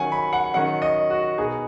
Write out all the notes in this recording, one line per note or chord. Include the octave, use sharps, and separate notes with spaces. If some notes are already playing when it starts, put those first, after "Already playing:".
Already playing: D#3 F#3 C#4 F#5 G#5
B5
F#5
D#3 F#3 C#4 F#5
D#5
F#4
B2 B3 D#4 G#4